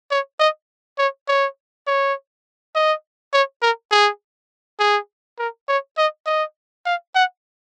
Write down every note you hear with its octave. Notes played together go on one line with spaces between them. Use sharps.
C#5
D#5
C#5
C#5
C#5
D#5
C#5
A#4
G#4
G#4
A#4
C#5
D#5
D#5
F5
F#5